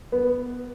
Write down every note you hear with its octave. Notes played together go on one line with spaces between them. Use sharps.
B3